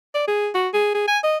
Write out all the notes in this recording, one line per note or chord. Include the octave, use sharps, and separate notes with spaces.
D5
G#4
F#4
G#4
G#4
G#5
D#5